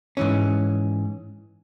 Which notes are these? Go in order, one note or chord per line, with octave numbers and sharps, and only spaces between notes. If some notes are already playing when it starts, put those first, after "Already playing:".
G#2 E3 C#4